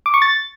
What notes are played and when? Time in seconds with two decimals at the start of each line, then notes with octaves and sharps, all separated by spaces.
0.06 D6
0.14 C#6
0.22 A6